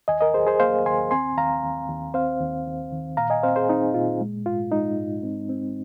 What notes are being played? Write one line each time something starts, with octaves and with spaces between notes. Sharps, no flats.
D#2 D#5 G#5
A#4 D#5
D#2 G#4 C5
G#4 C5
A#3 C5 F5
D#2 G#5 C6
C4 G#5 C6
D#2 F5 A#5
D#2
D#2
C4 C5 F5
D#2
D#2
D#3
A#2 F5 A#5
D#5 G#5
C4 C5 F5
G#4 C5
C4 D#4
A#2 F4
G#3
G#2 F4
G#3 D#4
G#2
C4
C4